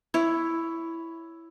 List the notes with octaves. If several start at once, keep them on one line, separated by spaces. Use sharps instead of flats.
E4 C#5